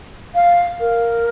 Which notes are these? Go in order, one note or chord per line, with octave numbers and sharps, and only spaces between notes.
F5
A#4